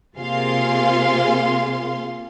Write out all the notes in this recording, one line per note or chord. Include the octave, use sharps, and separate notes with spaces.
C3 A#3 F4 G#4 F5 C6